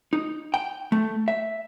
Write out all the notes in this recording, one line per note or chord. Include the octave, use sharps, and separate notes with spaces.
D#4
G5
A3
E5